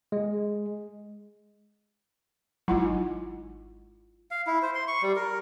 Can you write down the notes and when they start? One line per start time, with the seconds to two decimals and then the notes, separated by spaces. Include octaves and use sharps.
0.12 G#3
2.68 G#1 F#3 E4 F4 F#5
4.31 F5
4.47 E4
4.62 C5
4.75 C6
4.88 C#6
5.03 G3
5.16 A#4